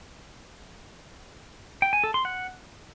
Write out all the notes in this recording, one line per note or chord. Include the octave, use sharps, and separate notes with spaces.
G5
G#5
A4
C6
F#5